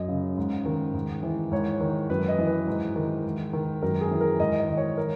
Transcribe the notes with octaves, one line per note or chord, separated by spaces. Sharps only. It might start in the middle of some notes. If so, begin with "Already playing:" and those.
Already playing: F#2 D#5
C#3
G#2
D#3
G#2
E3
G#2 C#5
D#3
F#2 B4
D#5
E3
B4
G#2
D#3
G#2
D#3
F#2 A#4
G#4
E3
A#4
G#2 D#5
D#5
D#3
C#5
A#4